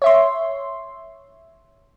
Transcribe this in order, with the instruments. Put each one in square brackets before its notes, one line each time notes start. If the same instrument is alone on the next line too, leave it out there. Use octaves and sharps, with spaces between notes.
[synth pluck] C#5 E5 C6